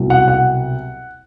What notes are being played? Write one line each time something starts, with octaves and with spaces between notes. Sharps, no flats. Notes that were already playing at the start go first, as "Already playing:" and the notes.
Already playing: C2 B2 F#3
F#5
F#5